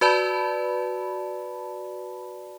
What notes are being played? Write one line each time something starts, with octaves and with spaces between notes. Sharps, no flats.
F#4 B4 D5 A5 B5